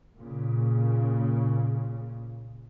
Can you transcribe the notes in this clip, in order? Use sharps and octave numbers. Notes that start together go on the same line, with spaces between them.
A#2 C#3